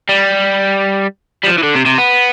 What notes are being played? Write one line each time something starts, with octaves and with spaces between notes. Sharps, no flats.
G3
G3
F3
E3
D3
C3
C3
B3